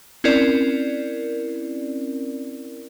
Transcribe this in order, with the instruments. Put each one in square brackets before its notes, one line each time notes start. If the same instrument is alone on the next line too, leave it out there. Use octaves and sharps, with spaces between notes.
[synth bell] C4 C#4 E4 A#4 D5